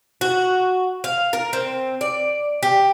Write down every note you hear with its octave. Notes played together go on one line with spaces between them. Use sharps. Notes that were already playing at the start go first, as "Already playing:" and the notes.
F#4
F5
A#4
C4
D5
G4